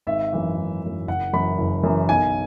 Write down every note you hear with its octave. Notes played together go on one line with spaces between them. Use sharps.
G#1 E5
F#2 E3
G#1
F#2 E3
F#1 F#5
F#2 E3 B5
F#1
F#2 E3
B1 G#5